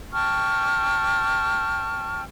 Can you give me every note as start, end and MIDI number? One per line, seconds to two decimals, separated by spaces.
0.13 2.22 79
0.13 2.22 81
0.13 2.22 85
0.13 2.22 89